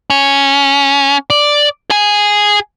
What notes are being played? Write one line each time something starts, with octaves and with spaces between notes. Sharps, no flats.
C#4
D5
G#4 G#5